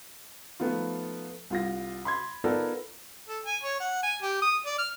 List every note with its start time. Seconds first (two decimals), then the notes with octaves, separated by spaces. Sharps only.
0.60 F3 A3 B3 D#4 F4
1.50 C2 F4 A#6
2.05 B5 C6 G#6
2.44 B3 D#4 F4 A4 A#4 D5
3.28 A4
3.46 G#5
3.63 C#5
3.80 F#5
4.03 G#5
4.22 G4
4.42 D#6
4.66 D5
4.78 F6